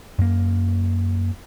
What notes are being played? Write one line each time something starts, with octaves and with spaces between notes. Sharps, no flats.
F#2 A#3